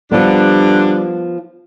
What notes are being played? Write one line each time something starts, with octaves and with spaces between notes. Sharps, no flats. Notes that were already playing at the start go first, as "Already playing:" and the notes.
D3 F3 G3 B3 D4